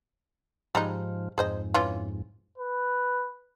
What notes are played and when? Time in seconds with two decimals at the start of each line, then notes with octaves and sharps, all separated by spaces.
0.75 G#2 F3 G3 G#3 D#4
1.38 F2 G#2 G#4 C5 D#5
1.74 E3 C#4 F4
2.58 B4